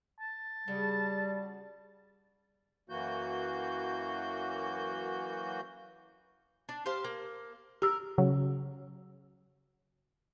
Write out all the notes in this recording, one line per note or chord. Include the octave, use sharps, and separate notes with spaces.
A5
C#3 G3 F#4 G#4
F#2 E3 A#3 F#4 G6
D4
G4 C5 F5
A#3
G4 A#4 E6
C#3 F#3